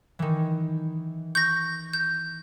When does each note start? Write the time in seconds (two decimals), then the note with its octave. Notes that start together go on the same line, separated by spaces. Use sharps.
0.19 D#3 E3
1.35 C#6 G6 A#6
1.93 G6